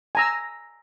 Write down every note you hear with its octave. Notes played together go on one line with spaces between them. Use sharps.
G#5 A#5 E6